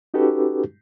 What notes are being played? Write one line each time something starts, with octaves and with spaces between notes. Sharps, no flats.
C#4 D#4 F#4 G4 A4 B4